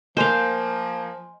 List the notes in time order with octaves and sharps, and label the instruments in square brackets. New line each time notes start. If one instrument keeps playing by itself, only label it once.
[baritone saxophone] F3 [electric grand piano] A#3 [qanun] C5 F5 [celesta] D#5 G#5 C6